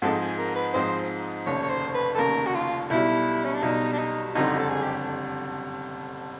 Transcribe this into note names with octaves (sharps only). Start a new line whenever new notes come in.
G#2 F3 G#3 C4 D#4 A4
G#4
A#4
B4
G#2 F3 G#3 C4 D#4 C5
F1 D#2 C#3 C#5
C#5
C5
B4
A4
F1 D#2 C#3 A#4
F#4
F4
B1 B2 G3 E4
C#4
D4
B1 B2 G3 D#4
D4
D#4
F#1 F2 D3 G3 C4 D#4
A4
G#4
G4